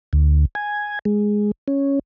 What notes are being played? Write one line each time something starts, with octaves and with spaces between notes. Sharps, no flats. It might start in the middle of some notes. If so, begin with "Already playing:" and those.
D2
G#5
G#3
C#4